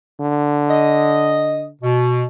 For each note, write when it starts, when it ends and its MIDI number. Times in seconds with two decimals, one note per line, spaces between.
0.20 1.72 50
0.70 1.63 75
1.82 2.24 47